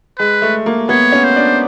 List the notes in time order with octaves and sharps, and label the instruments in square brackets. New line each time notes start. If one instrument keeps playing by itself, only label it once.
[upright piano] G#3 [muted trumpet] B4
[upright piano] A3
A#3
[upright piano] B3 [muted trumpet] C#5
[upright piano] C#4
[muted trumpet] C5
[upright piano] D4